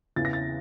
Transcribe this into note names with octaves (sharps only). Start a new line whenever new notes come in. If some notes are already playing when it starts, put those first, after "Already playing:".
E2 C#3 E3 A6
A#6
A6